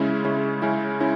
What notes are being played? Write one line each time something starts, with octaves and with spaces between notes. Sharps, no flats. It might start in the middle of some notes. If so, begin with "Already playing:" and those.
Already playing: C#3 G#3 C#4 E4
C#3 G#3 C#4 E4
C#3 G#3 C#4 E4
C#4 E4